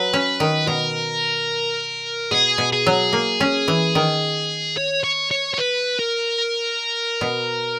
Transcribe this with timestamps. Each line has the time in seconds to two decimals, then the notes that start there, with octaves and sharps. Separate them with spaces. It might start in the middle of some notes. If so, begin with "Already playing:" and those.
Already playing: F#3 B4
0.13 C#4
0.40 D#3
0.67 B2 A#4
2.31 B2 G#4
2.58 B2
2.73 G#4
2.87 F#3
3.13 A#3
3.40 C#4
3.68 E3
3.95 D#3
4.77 C#5
5.04 C#5
5.31 C#5
5.54 C#5
5.58 B4
5.99 A#4
7.21 B2